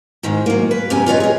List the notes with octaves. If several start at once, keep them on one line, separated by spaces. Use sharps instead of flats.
G#2 D#3 G#3
F#3 A#3
B4
F#2 C3 C#4 G4 G#5
F4 B4 C#5 D#5
G#4 D#5